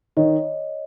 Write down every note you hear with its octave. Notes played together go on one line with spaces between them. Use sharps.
D#3 C#5 D#5